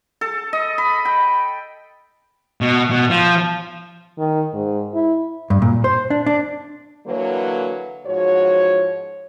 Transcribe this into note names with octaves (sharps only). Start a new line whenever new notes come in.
A4
D#5
B5
G5
B2
B2
F3
D#3
G#2
E4
G2
A#2
C5
D4
D4
D3 E3 F#3 A#3 B4 C#5
G#2 F3 F#4 C#5